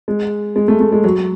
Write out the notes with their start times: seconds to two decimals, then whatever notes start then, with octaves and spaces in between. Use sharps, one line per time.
0.08 G#3
0.56 G#3
0.68 A3
0.80 A3
0.92 G#3
1.04 F#3